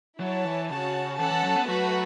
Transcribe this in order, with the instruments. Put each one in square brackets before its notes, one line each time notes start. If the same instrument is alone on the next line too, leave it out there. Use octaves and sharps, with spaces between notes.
[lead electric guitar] F#3 [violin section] E4 C#5 A5
[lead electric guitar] E3
[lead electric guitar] C#3 [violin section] F#4 C#5 A5
[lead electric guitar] E3 [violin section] C#4 A4 F#5 A5
[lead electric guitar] E3
F#3
B3
[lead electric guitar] F#3 [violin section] A3 F#4 B4